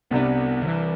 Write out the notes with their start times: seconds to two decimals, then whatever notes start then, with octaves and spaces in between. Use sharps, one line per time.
0.11 C2 C3 G3 B3 D4
0.62 D3
0.67 E3